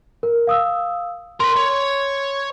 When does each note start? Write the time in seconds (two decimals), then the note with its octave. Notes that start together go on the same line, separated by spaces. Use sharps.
0.23 A#4
0.47 F5 D#6 E6
1.40 A#4 B5 C6
1.56 C#5